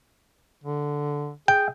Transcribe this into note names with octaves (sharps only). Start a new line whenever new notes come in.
D3
G#4 G5